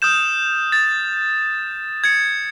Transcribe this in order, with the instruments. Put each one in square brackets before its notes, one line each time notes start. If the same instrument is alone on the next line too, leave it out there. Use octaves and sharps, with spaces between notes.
[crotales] D#6 F6 G6 E7
A6
G#6 C#7